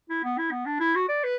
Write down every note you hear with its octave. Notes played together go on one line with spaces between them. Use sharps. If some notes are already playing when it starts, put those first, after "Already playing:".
E4
B3
E4
B3
D4
E4
F#4
D5
B4